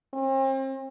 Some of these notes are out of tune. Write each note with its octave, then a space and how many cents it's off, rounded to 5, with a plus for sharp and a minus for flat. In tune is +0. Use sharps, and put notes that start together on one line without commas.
C4 +40